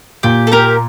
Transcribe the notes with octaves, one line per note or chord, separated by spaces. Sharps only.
A#2 G4
A4
A#3 G4 A#4